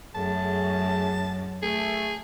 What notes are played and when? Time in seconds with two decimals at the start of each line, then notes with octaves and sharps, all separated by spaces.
0.15 F#2 A3 G#4 A5
1.62 A3 G#4